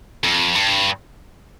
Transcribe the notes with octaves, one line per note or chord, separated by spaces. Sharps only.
F2
G2